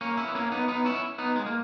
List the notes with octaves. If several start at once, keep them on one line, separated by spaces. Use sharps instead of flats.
A#3 C#4
C#4 E4
B3
A#3 C#4
B3 D#4
B3 D#4
C#4 E4
B3 D#4
G#3
A#3